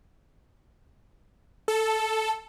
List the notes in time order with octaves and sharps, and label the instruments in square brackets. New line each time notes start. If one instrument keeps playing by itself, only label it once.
[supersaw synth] A4